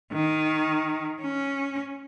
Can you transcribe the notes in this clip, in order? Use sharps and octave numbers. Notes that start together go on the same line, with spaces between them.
D#3
C#4